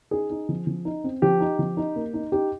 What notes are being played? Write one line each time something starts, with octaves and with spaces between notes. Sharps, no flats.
D#4 G#4
D#4
F3
F3
D#4
C4
F3 G4
D#4
F3
D#4
A#3
D#4
D#4 G4